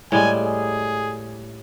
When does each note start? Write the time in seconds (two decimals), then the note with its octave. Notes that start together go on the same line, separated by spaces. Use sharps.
0.12 A2 G3 G#3 G#5
0.45 G#4